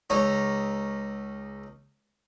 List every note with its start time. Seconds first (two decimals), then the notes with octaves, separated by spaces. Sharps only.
0.10 C#2 D#4 C#5